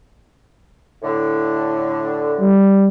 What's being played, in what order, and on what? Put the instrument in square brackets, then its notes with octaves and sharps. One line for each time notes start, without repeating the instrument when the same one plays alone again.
[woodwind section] A2 D3
[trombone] G3